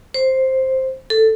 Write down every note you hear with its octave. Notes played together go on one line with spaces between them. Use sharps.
C5
A4